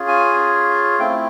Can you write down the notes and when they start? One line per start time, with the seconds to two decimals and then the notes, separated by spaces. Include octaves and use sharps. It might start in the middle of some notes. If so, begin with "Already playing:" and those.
Already playing: C#4 F4 G#4
0.08 G#5
0.99 A3 C4 E4 G5